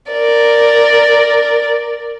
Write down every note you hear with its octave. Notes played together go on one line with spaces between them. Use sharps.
A#4 D5